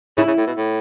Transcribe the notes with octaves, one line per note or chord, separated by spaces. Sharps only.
C#3 E4
C#3
A2
B2
A2